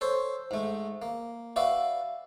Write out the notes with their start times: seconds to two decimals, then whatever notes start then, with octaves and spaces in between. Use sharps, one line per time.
0.01 A4 C5 C#5
0.51 G#2 A3
1.02 A#3
1.56 F#4 B4 D5 E5 F5